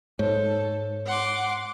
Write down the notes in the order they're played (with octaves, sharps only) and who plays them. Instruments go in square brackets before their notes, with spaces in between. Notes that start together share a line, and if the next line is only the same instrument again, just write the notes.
[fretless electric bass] G#2 [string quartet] A4 [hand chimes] C#5
[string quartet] F#5 C6 D6